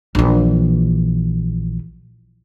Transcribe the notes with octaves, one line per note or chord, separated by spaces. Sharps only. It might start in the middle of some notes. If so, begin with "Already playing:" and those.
A#1 E3